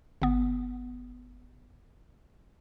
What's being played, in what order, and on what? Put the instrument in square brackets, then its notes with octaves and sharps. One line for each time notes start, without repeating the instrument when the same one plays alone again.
[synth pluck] G1 B3